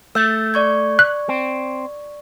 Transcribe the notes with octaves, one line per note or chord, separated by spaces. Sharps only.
A3 E6 G6 A6
D5 C#6 G#6
F#6
C4